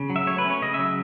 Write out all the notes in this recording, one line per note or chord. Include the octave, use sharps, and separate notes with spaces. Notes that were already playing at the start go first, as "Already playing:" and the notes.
Already playing: C#3
F#3
E5
A3 C#5
B4
C#4
C#5
C#3 D#5
F#3 E5